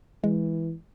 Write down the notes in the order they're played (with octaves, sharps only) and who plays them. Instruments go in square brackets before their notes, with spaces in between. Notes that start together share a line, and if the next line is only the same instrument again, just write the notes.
[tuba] E3 [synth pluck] G#3